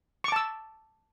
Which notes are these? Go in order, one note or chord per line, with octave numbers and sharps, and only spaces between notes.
A5 C#6 D6 E6